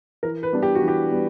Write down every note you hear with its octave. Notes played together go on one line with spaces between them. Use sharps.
E3 A#4
B4
G3 B3 D4
G4
F#4
E3
G4
G3 B3